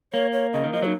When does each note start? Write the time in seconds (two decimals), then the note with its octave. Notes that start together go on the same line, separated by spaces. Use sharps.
0.13 A#3 C#5
0.33 C#5
0.53 C#3 D#5
0.64 D#3
0.73 F3 D#5
0.82 F#3 D#4